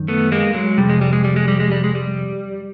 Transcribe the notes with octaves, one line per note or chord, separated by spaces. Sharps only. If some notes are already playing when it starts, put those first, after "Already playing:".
Already playing: F#2 D#3
A3 B3
G#3 A#3
F#3 G#3
F2 C3 G3
G#3
G3
G#3
G3
G#3
G3
G#3
G3
G#3
G3